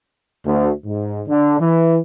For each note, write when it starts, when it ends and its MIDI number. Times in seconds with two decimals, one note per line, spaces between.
0.45 0.71 38
0.86 1.22 44
1.28 1.57 50
1.60 1.98 52